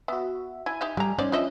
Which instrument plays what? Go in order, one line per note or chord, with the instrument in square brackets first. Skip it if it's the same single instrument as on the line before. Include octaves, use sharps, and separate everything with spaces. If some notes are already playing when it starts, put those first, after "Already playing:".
[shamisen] B3 [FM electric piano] F#4 E5
[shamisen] E4 [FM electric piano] G#5
[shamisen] D#4 G4 E5
[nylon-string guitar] G3 [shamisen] A3 A#5
[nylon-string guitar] C#4 [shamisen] D#4 C5 D5
[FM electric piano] F3 [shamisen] D4 D#5 E5